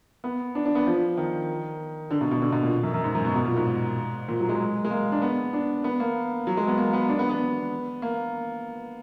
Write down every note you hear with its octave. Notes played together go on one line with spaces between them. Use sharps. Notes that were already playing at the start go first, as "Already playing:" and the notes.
B3
D4
D4
B3
F3
D#3
D3
B2
B2
D3
B2
A#2
F#2
F#2
G#2
F#2
B2
B2
A#2
G#2
A#2
F#3
G#3
G#3
A#3
D4
B3
D4
B3
A#3
F#3
G#3
B3
A#3
B3
D4
B3
B3
A#3